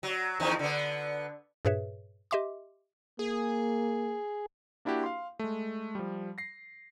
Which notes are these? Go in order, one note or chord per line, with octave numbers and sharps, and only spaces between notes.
F#3
E2 D#3 F3
D3 B3
G2 A#2 G#4 B4 C#5 E5
G4 D#5 E5 C6 D6
A#3 G#4
A#3 D4 E4 F#4 G4
F5 C6
G#3 A3
F3 G3
A#6 C7